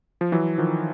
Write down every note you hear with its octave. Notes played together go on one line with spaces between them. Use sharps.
F3
E3 F#3
D#3 F3